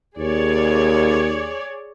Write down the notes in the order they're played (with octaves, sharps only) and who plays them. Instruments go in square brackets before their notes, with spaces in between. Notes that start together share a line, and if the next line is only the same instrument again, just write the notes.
[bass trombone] D#2 [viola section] G#4 C#5 D5